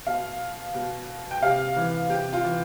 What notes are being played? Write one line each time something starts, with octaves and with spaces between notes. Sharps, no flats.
B2 F5
B2
G5
C3 F5
E3
C3 G4
F4
E3